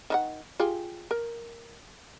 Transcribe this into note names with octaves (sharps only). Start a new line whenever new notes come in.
D#3 D#4 F#5
F4 G4 G#4
A#4